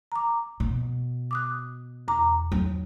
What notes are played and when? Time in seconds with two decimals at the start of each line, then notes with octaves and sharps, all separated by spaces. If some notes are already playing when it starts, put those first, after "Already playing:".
0.12 A#5 D6
0.60 B2
1.31 D6 D#6 F#6
2.08 E2 A#5 D6
2.52 F#3 D#4